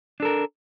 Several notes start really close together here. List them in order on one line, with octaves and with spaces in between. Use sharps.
D4 A4 A#4